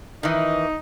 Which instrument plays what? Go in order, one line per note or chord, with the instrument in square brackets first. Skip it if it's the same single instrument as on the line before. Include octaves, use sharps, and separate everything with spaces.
[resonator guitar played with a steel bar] D#3 E3 [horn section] D#4